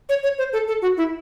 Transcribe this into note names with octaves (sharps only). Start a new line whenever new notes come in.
C#5
C#5
C5
A4
A4
F#4
E4